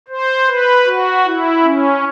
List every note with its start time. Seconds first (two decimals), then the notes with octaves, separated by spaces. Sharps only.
0.08 C5
0.48 B4
0.86 F#4
1.25 E4
1.64 C#4